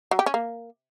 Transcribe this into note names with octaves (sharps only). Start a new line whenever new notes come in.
F#3
G4
C#4
A#3